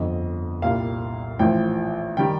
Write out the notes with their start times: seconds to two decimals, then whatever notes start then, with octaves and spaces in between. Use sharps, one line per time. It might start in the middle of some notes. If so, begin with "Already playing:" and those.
Already playing: G1 F2 D3 F3 D#5
0.62 C2 A#2 G3 F5
1.39 A1 A2 F3 G5
2.17 D#3 G3 G5